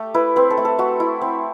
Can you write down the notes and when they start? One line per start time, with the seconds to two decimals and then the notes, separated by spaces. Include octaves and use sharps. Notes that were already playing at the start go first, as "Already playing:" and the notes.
Already playing: A3 G4
0.14 E4 B4
0.36 C4 B4
0.50 A4
0.57 A3
0.65 A4
0.79 A3 F#4
1.00 E4
1.22 C4